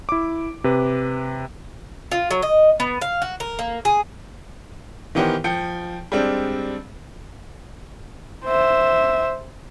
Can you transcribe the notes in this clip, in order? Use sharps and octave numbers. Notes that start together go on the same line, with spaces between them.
E4 D6
C3 B4
F4
F#3
D#5
B3
F5
F#4
A#4
A#3
G#4
D#3 E3 B3 G4 A#4 C5
F3 G5 C#7
G3 G#3 C4 D4
C5 E5